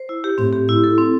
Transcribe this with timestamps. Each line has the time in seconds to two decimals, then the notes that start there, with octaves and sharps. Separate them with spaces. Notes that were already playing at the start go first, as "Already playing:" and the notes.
Already playing: C5
0.09 E4
0.24 G4
0.38 A2 C4
0.53 G4
0.69 A2 E4
0.84 A4
0.98 C4